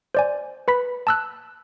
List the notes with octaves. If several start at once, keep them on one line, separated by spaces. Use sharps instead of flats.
C5 D5 G#5
B4 B5 B6
A5 E6 F#6